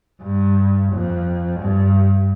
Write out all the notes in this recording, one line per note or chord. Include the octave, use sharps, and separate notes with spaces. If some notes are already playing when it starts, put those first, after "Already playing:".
G2
F2
G2